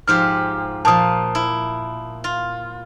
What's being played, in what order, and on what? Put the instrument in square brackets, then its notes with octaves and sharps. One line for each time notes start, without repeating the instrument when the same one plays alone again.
[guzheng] G#2 F3 G4 [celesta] F6
[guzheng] A#2 F3 [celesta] A5 D#6
[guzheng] E4
F4